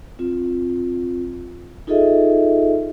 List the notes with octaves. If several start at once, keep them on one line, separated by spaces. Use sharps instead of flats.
C4 F4
D#4 F4 G#4 A4 D#5 E5